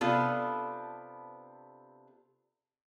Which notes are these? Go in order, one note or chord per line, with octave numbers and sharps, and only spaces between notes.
C3 B3 D4 F4 A4